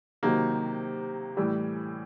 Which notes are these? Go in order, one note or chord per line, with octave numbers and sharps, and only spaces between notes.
C3 D#3 F#3 A#3
A2 E3 G3